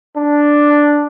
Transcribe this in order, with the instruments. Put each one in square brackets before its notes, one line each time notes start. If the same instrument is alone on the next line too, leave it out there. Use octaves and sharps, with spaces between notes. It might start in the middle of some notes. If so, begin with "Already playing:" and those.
[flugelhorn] D4